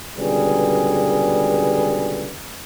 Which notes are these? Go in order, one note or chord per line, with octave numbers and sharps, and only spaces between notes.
C#2 B2 D3 G3 G#4 B4